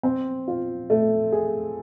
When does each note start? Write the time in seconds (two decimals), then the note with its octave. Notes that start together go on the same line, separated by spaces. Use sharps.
0.03 C4
0.48 F4
0.90 A3
1.32 G#4